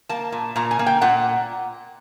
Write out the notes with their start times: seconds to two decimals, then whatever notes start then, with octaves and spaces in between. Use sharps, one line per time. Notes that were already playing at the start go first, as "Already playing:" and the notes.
0.09 A#3 A5
0.32 A#2
0.56 A#2 A#5
0.71 G#5
0.79 A#3
0.86 G5
1.01 A#2 F#5